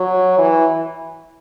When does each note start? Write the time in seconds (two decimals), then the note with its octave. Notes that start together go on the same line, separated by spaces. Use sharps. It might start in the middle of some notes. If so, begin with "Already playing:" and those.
Already playing: F#3
0.38 E3